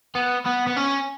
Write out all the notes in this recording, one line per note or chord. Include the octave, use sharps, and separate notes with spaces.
B3
B3
B3
C#4